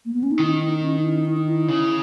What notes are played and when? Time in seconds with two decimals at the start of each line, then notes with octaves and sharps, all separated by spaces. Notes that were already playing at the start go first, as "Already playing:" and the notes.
0.05 A#3
0.14 B3
0.23 C#4
0.31 D#4
0.39 D#3 E4
0.61 D#4
0.82 C#4
0.99 D#4
1.04 E4
1.25 D#4
1.37 D#4
1.47 E4
1.68 C#3